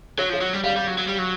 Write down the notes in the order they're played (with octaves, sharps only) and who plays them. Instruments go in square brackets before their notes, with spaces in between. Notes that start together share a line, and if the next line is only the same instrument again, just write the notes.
[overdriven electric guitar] F#3 [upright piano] C#5
[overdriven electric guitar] F3 [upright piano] C#5
[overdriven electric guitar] F#3
G3
[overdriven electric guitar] G3 [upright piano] F5
[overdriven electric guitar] G3
F#3
F#3
G3
F#3